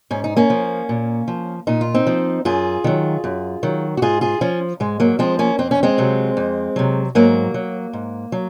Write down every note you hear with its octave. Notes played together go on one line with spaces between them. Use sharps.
G#2 C#4
D#4
A#3 C#4
F3
A#2
F3
A#2 D#4
F4
C4 D#4
F3
F#2 F4 G#4
D#3 F#3
F#2
D#3 F#3
F#4
G#2 F4 G#4
F4 G#4
F3 C#4 F4
G#2 G#3
F#3 A#3
F3 G#3 C4
A#3 C#4
F2 C4
C#4
G#3 C4
C3 F#3
F2
C3 F#3
G#2 F#3 A#3
F#3
G#2
F#3